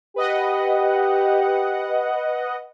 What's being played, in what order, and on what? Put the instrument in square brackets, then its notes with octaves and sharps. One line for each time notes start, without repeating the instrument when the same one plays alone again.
[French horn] G4 [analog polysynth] B4 D#5 F#5